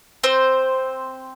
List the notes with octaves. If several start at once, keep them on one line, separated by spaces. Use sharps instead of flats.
C4 C5